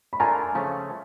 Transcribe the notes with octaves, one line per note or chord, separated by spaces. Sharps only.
B5
A3 D4 F4 A#4 G#5 A#5
C#3 F3 A3 C#4